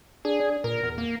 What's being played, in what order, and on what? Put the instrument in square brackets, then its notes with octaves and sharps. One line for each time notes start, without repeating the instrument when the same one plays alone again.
[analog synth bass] D4 [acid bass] G#4
[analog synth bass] D4
[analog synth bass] A#2 [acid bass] A#4
[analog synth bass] E2
[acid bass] A#3